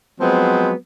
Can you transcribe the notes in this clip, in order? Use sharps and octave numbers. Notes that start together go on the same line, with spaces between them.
F3 F#3 G#3 B3 C4 B4